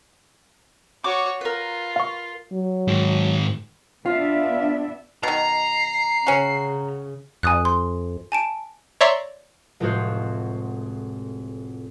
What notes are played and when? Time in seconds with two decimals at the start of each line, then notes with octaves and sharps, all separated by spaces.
1.04 F#4 C#5 D6
1.41 F4 A#4 B4
1.96 F5 C#6
2.52 F#3
2.88 G#2 D#3
4.06 B3 D4 F4 E5 F5
5.23 B2 D#3 A#5 C7
6.27 C#3 C#4 F#4
7.43 F2 G#5 D#6 F#6
7.65 C6
8.32 G#5 A5 D7
9.01 C#5 D5 E5 A#5 C6 C#6
9.80 F1 A2 G#3 F4 F#4 C5